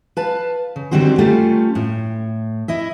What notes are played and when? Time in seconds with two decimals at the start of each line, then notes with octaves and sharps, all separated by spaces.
0.17 B4 F5 A5
0.76 C#3
0.91 D3 D#3 G3 C4 F#4 C5
1.18 G3 A3 C#4 F4 G4
1.75 A2
2.68 E4 D#5 E5